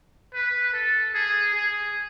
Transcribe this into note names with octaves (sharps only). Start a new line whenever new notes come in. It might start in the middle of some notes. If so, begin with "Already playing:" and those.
B4
A4
G#4
G#4